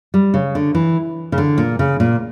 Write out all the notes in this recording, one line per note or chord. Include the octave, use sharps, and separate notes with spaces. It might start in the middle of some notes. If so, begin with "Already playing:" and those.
G3
C#3
D3
E3
C#3
D3
A#2
C#3
A#2